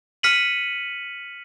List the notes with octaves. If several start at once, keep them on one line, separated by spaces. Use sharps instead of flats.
F6 B6 C#7 D#7 F#7